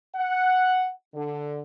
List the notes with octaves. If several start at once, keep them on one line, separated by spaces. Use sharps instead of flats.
F#5
D3